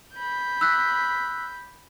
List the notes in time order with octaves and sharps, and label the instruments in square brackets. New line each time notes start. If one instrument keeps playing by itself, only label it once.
[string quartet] B5 G6
[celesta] E6 F#6 B6